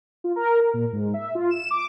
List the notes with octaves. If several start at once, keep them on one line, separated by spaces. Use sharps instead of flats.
F4
A#4
A#4
A#2
G#2
E5
F4
E7
D6